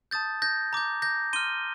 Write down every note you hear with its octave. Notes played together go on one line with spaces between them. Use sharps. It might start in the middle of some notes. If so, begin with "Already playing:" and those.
A5 D#6 G6 A6
G6 A#6
A#5 D6 G6
G6 A#6
C6 F6 D#7 G7